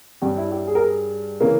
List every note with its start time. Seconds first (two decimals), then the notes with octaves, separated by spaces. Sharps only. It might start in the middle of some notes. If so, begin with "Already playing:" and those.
0.22 G2 G3 C#4 G4
0.37 E4
0.52 G4
0.67 G#4
0.75 A#4
0.81 G#4
1.41 C#3 E3 A#3 C#4